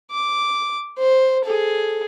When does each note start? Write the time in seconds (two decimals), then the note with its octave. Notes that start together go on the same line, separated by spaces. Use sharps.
0.11 D6
0.98 C5
1.44 G#4 A4